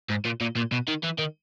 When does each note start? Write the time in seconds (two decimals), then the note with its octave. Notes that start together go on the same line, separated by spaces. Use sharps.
0.10 G#2
0.25 A#2
0.41 A#2
0.56 A#2
0.72 B2
0.88 D#3
1.03 E3
1.18 D#3